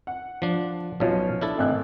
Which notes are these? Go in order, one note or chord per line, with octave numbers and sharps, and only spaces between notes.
F#5
F3 D4
B1 B2 F3 C#4 F4
D4 E4 A4
G#1 A3 F#6